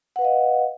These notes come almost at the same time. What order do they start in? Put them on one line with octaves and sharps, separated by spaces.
F#5 B4 F5 D#5